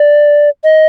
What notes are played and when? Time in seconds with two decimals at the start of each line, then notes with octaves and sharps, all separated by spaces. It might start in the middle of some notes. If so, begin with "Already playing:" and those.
Already playing: D5
0.64 D#5